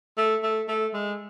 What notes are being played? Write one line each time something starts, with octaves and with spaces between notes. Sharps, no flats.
A3
A3
A3
G#3